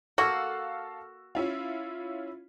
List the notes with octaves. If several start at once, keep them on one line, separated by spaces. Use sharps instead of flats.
A#3 F#4 A4 F5 E6
C#4 E4 F4